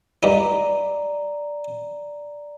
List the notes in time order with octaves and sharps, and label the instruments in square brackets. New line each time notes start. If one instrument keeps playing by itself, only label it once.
[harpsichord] G2 D#4 [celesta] D5 A#5